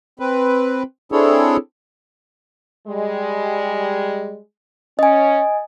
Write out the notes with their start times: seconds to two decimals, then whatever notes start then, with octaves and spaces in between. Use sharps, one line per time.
0.20 C4 B4
1.12 C4 D4 E4 G#4 A4 C#5
2.88 G3 G#3
4.99 C#4 D#5 G#5